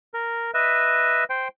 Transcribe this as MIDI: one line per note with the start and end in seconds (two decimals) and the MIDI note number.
0.14 0.51 70
0.54 1.24 71
0.54 1.24 75
0.54 1.24 76
1.30 1.48 72
1.30 1.48 79